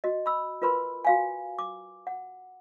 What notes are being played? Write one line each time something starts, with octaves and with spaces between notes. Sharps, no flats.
F#4 D#5
B5 E6
F4 A#4 B4 B5 C6
F#4 F5 G#5
D6
F#5